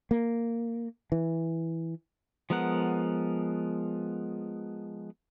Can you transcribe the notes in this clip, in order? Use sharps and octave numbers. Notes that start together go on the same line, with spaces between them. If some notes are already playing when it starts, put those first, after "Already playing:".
A#3
E3
F3 G#3 B3 A#4 F#5